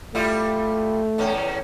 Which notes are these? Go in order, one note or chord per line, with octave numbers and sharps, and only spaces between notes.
G3 A3 E4 F4
E2 A2 C#4